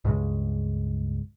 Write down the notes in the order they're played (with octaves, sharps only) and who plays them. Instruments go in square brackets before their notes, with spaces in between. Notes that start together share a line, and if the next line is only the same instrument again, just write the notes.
[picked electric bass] C#2 G2 C#3 G#3